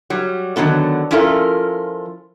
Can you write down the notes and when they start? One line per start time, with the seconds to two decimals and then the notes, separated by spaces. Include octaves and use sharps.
0.10 F#3 G3
0.56 D3 D#3 F#3 B3 A4
1.11 F3 C#4 E4 F4 A4 A#4